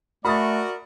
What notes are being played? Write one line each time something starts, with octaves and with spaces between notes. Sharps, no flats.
A3 F#4 A#4 D5 B5 D#6 A6